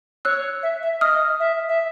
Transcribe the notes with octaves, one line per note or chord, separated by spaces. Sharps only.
C#5 E6 F#6
E5
E5
D#5 D#6 F6
E5
E5